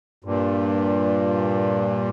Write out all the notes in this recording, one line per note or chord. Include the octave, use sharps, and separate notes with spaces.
G2 A#2